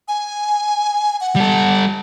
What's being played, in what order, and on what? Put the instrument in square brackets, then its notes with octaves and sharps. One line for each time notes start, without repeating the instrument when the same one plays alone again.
[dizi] G#5
F#5
[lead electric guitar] G3 A4